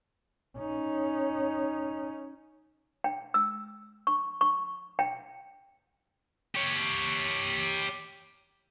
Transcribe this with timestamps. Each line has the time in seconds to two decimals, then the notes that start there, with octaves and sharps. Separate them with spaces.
0.57 C#4 D#4
3.04 G5
3.34 E6
4.07 C#6
4.41 C#6
4.99 G5
6.55 G4 C#5